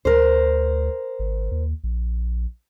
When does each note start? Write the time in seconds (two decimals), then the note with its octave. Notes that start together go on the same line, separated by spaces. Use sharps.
0.05 D2 A#4 C5
1.19 G#1
1.52 D#2
1.84 A#1